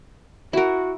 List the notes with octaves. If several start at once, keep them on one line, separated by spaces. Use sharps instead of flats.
E4 F#4 A#4